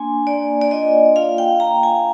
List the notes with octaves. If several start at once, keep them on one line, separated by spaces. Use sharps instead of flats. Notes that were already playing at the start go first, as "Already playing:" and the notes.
Already playing: A#3 D4 G#5 C6
A#3 D5
D5
F4 D#5
F4 F5
G5
F4 A#5
G#5